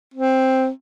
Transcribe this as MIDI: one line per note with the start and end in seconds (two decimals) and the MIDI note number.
0.14 0.69 60